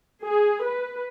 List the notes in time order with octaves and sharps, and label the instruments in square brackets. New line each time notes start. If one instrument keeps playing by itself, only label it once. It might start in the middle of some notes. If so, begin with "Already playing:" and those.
[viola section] G#4
B4